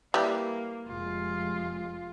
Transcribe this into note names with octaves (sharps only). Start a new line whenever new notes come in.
G3 A#3 E4 B4 D5
F1 F2 G#3 F4